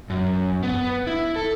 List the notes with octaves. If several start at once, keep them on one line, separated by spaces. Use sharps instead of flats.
F#2
B3
E4
A4